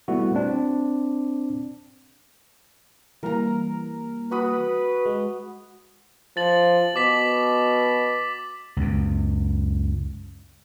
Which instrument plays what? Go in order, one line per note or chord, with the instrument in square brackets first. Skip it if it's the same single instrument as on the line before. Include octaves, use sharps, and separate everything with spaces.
[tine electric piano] G3 A3 B3 E4 F#4
C4 D4
[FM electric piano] E3 G3 A#3 [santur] A#4 A#5
[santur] F#4 B5 D#6 [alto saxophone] B4
[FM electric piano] G#3
[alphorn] F3 [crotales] A6 F#7
[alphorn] B2 [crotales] D6 B6
[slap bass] C#2 F#2